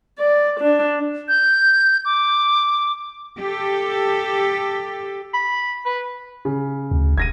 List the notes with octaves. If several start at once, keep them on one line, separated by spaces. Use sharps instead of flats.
D5
D4
G6
D6
G4 A4
B5
B4
C#3
D2
E1 G#6 A#6 D#7